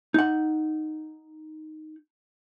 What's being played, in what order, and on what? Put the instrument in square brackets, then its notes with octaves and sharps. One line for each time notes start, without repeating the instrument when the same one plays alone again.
[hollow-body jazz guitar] D#4 F#5